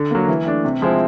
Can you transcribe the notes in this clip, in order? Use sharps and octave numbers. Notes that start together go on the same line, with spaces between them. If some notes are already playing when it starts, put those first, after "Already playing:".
Already playing: D3
F#3 A#3
E3
A3 D4
C3
F3 G#3 C4 E4